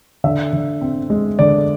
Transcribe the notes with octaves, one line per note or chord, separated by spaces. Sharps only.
D3 E5
D3
C4
G#3
D3 D5